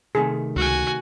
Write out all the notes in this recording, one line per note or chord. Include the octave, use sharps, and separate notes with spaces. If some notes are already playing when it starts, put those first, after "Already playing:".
C3 D#3 A3 G#4
C#2 F#4 G#5